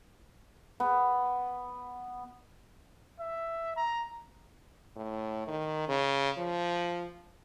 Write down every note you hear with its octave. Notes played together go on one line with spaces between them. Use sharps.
B3
E5
A#5
A2
D#3
C#3
F3